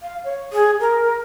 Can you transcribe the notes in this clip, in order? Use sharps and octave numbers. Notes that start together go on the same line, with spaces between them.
F5
C#5
G#4
A#4